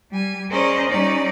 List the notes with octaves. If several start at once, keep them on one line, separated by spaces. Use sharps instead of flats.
G3 G#5
C#4 G#4 A#4 C5 D5 D#5
G3 C#4 D#4 D5